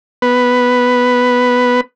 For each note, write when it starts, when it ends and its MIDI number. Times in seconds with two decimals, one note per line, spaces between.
0.22 1.81 59
0.22 1.81 71